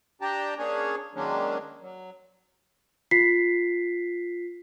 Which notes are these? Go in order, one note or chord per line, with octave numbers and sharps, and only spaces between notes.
D4 G4 G5 A5 A#5
A#3 C#4 D4 G#4 C#5
D#3 F#3 G#3 A#3 C#4 D4
F#3
F4 B6 C7